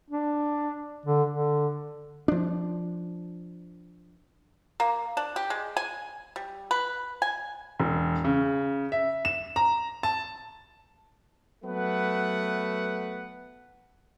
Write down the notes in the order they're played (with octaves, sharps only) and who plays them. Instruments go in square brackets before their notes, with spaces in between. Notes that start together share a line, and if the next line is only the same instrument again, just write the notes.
[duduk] D4
D3
D3
[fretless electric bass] F3 D4
[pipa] A#3
D4
G4
G#3
G#5
G3
B4
G#5
[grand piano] E1
C#3
E5
E7
A#5
A5
[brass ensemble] F#3 A3 B3 B4 F#5